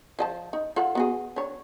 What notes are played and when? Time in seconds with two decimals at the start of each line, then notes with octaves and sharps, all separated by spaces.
0.19 F3 D#5 A5
0.53 D#4
0.76 F4 A4 F#5
0.95 B3 F#4 G#4
1.36 D4 C#5